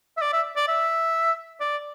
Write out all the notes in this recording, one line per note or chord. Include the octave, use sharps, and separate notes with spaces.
E5
D5
E5
D5
E5
D5